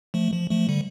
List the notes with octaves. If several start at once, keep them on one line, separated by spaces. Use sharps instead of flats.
F3 A3
F3
F3 A3
D3 G3